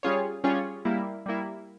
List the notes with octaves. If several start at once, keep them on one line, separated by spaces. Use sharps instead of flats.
G3 C#4 F4 G#4 C#5
G3 C#4 F4 G#4 C#5
G3 A#3 E4
G3 A#3 E4